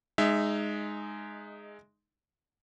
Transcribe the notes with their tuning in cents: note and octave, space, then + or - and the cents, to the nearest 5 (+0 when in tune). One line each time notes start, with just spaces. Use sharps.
G#3 +0 D#4 -15 E5 +5